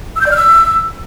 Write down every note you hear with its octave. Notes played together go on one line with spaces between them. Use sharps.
E6
G6
D5
F6
E6